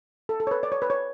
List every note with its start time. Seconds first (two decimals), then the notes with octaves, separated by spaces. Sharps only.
0.29 A4
0.40 A4
0.47 C#5
0.51 B4
0.63 D5
0.72 C#5
0.82 B4
0.90 C#5